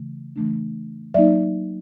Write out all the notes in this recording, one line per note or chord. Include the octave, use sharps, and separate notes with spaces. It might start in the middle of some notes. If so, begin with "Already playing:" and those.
Already playing: C#3 E3 A3
C#3 E3 A3 D4
F#3 A#3 D#4 D5 E5